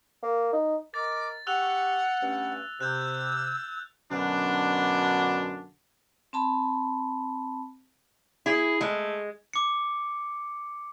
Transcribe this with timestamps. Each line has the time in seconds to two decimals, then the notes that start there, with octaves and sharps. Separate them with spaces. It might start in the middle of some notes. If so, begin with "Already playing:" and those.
0.23 A#3
0.53 D#4
0.94 A#4 D#5 D6 A6
1.47 G4 F#5 C#6 E6 F#6 F7
2.21 G2 A3 C#4
2.81 C3 E6 F#6 G6
4.11 F#2 B2 D3 D4
6.33 C4 A5 B5
8.46 E4 G#4
8.81 G#3 A3
9.53 D6 C#7